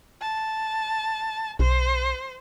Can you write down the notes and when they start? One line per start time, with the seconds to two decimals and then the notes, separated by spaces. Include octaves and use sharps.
0.21 A5
1.59 B1 C5